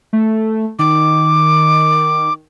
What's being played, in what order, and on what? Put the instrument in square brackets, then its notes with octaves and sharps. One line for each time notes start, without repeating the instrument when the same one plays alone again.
[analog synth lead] A3
[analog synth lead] D#3 [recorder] D6